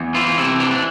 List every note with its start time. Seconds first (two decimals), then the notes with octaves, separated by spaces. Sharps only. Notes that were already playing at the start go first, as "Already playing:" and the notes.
Already playing: E2
0.14 E3 F4
0.37 C3 E4
0.60 E3 D4
0.71 D4